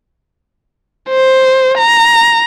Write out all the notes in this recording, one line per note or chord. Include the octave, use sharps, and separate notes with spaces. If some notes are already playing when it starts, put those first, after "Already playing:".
C5
A#5